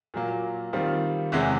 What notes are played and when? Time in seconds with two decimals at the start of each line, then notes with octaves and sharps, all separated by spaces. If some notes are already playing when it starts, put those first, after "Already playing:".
0.14 A#2 F#3 A#3
0.73 D#3 G3 C4 F4
1.32 E2 C3 E3 G#3 C#4